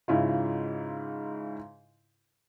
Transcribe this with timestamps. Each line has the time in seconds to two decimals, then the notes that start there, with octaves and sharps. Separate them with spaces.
0.08 G#2 C#3 E4 F4